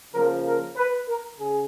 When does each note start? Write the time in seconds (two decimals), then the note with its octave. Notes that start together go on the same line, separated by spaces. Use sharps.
0.13 C#3 F3 A#3 A#4
0.44 A#4
0.76 B4
1.07 A#4
1.37 C#3 G#4